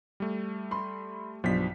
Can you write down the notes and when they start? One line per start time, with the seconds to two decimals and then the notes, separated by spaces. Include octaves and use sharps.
0.20 G3 A3
0.71 B5 C6
1.44 B1 G2 F3 B6